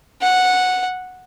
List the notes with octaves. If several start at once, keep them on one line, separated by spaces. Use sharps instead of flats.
F#5